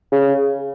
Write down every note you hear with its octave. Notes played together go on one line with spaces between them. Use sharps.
C#3